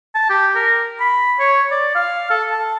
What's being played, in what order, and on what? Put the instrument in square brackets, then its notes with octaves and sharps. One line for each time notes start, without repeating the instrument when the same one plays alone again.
[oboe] A5
G4
A#4
B5
C#5
D5
F5
A4
A5